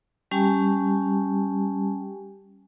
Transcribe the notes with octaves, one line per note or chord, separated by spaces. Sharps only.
G3 C#4 G4 G#5 A5